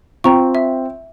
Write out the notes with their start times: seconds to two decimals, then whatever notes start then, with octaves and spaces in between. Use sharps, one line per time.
0.24 C4 F4 G5 A#5 C#6
0.55 E5